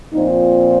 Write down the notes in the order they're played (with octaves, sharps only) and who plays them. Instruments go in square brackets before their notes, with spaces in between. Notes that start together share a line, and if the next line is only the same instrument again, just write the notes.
[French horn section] A#2 F3 C4 D#4